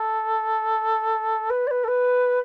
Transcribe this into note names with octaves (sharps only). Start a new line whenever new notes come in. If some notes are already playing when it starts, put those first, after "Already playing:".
Already playing: A4
B4
D5
B4
A4
B4